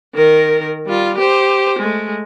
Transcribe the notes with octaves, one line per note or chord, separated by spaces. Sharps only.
D#3 A#4
G3 F4
G4 C5
G#3 A3